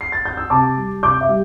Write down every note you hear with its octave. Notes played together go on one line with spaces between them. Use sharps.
C7
A6
G6
E6
C3 A5 D6
G3
C3 D6 G6
E5
G3